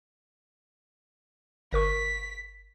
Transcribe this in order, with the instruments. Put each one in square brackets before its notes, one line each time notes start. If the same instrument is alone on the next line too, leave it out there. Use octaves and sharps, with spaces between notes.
[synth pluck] G1 A#4 C#6 [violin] B6